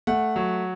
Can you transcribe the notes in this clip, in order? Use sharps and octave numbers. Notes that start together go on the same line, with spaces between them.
A3 F#5
F#3